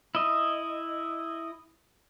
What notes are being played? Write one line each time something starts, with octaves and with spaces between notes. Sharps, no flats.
E4 D#5